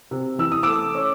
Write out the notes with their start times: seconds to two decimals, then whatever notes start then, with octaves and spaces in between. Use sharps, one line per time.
0.11 C3
0.39 E3 E6
0.52 D#6
0.63 A3 D6 E6
0.94 C#4